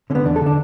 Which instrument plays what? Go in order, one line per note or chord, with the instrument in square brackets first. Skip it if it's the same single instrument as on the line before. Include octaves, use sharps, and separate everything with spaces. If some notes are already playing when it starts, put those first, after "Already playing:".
[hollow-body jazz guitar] D3 C#4
B3
E2 D4
A4
D3
D4